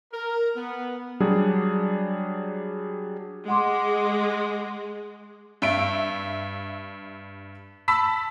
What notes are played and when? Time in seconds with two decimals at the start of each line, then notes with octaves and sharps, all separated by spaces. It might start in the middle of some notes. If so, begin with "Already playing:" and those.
0.13 A#4
0.56 B3
1.20 F#3 G3 D4 G#4
3.48 G#3 F#5 C6 D6
5.62 G2 E5 D7
7.88 A5 B5 E6 B6